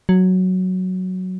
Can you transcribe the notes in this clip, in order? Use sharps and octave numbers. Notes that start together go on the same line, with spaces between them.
F#3